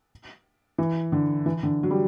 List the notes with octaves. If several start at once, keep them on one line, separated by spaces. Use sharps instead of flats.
E3
D3
E3
D3
F#3
G3